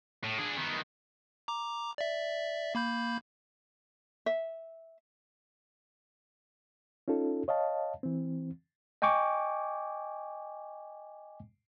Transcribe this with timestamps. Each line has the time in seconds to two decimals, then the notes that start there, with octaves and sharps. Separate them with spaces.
0.24 A2
0.39 D4 G#4
0.58 D#3 B3
1.48 A#5 D6
1.98 D5 E5
2.75 A#3 B5 G6
4.26 E5
7.08 C#4 D#4 F4 A4
7.48 C#5 D#5 F5 A5
8.03 E3 C4
9.02 D#5 G5 G#5 C#6 D6